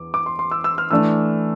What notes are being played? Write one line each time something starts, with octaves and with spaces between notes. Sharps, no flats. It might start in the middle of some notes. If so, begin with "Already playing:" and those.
Already playing: E2 D6
D6
C6
C6
E6
E6
F6
E3 A3 D4 E6